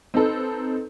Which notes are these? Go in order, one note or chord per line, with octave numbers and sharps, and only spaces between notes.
C4 D#4 A4 B4